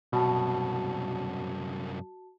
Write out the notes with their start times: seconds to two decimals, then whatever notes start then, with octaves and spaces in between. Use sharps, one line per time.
0.13 C2 F#2 B2 F#4 A5